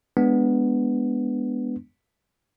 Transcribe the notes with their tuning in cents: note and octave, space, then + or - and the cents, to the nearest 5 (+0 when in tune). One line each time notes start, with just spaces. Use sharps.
G#3 +0 B3 +0 D4 +0